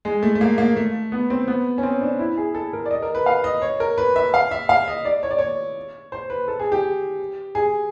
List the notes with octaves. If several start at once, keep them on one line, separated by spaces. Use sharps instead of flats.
G#3
A3
A3
A#3
A#3
A3
B3
C4
B3
C#4
C4
D4
E4
G#4
A4
A#4
D5
D#5
A#4
B4
F5
D#5
C#5
A#4
B4
E5
F5
E5
F5
D#5
D5
C#5
D5
C#5
C5
B4
A4
G#4
G4
G#4